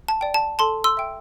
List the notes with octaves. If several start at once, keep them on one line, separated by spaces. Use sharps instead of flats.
A5
D5 G5
A5
A4 A5 C6
C6 E6
E5 G5